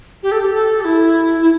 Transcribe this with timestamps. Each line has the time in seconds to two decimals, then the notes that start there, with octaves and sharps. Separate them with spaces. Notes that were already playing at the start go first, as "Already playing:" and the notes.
0.23 G4
0.32 A4
0.41 G4
0.54 A4
0.81 G4
0.85 E4
1.41 E4